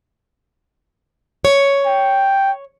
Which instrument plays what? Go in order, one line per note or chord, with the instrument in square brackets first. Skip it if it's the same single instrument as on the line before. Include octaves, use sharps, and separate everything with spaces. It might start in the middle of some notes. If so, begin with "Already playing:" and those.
[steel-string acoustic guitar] C#5
[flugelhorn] G5